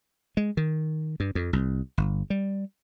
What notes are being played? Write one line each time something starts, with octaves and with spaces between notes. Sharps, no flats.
G#3
D#3
G2
F2
C2
G1
G3